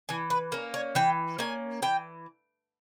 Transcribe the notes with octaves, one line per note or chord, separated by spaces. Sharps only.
E3 G#5
B4
A#3 C#4
C#5
E3 G5
A#3 C#4 G#5
E3 G5